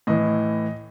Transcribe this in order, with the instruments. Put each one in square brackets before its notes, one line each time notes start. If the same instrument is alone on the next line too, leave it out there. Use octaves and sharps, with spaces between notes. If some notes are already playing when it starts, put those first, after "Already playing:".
[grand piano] A2 E3 D#5